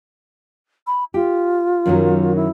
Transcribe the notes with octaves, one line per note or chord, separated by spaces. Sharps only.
B5
F4 G4
F#2 D#3 F#3
E4